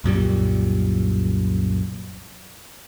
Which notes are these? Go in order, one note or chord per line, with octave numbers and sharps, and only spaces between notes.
C2 F#2 A#2 G3